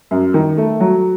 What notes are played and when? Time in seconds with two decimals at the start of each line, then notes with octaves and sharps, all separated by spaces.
0.11 F#2
0.34 D#3
0.57 A3
0.80 F#3